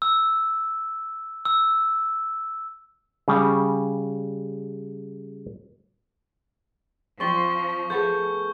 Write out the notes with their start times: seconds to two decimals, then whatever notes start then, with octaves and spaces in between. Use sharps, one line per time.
0.02 E6
1.45 E6
3.28 C#3 G3
7.20 F3 C4 C5 D5 C#6 G7
7.90 A3 B3 G#4 G6